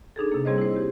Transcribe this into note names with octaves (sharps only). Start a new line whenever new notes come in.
D4 D#4 G#4 A4
C3 A#3
G3 C4 G#4 C5 C#5 D#5
E4 C5
G4